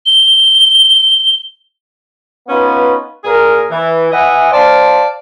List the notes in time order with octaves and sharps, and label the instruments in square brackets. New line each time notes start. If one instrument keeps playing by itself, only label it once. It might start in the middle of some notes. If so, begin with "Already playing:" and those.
[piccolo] G7
[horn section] B3 C#4 D#4 F4 B4
A#2 G#4 A#4
E3
E3 D#5 E5 F#5 G#5
C5 D5 F5 A5